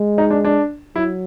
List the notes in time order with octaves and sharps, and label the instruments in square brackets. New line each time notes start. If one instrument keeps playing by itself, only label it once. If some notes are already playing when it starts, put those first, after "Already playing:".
Already playing: [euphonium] G#3
[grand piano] D#4
D4
D4
[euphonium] F#3 [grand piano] E4